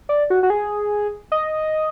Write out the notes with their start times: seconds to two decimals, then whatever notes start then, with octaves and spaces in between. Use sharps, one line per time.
0.09 D5
0.30 F#4
0.43 F#4
0.50 G#4
1.32 D#5